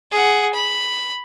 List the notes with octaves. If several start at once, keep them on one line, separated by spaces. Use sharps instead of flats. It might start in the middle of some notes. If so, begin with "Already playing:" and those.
G#4 F#5
B5